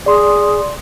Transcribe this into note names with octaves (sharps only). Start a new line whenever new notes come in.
G#4 D5 C6